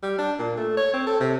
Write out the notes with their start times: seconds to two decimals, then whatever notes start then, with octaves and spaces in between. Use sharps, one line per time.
0.03 G3
0.18 D4
0.39 A#2
0.57 A3
0.77 C#5
0.94 C4
1.07 A4
1.21 C3